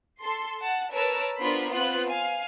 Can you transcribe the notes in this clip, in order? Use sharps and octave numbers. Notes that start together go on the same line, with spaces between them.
A4 C6
F#5 A5
A#4 B4 C#5 A5 E6
B3 D4 F4 A#4 C5 B5
B3 C4 F4 B4 F#6
F5 G#5